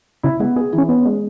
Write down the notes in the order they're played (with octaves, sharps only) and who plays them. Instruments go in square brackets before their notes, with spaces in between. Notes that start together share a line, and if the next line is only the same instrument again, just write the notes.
[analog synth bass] C#3 [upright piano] E4
[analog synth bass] G#3 [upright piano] B3
[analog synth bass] B3 [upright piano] G#4
[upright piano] E3
[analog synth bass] C#4
[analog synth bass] B3 [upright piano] C#4
[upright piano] G#3